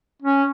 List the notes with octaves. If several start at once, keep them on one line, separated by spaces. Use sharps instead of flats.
C#4